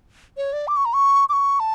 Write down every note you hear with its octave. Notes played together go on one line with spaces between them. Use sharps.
C#5
D5
D6
C#6
A#5
C#6
D6
C#6
A5